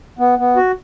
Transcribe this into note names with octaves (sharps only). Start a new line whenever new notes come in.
B3
B3
F#4